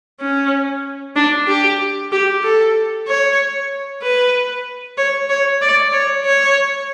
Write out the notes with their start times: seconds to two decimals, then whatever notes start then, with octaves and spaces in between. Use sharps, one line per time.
0.21 C#4
1.16 D4
1.48 G4
2.12 G4
2.44 A4
3.08 C#5
4.03 B4
4.98 C#5
5.30 C#5
5.62 D5
5.93 C#5
6.25 C#5